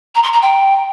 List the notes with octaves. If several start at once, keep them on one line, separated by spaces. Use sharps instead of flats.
A#5
C6
A#5
G5